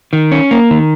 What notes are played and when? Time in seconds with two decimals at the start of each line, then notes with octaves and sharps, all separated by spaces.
0.13 D#3
0.31 C#4
0.51 A#3
0.70 D#3